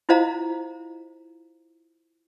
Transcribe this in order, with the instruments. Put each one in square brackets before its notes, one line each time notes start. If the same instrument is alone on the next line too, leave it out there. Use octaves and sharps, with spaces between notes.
[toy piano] E4 F4 C5 D#5 F5 A#5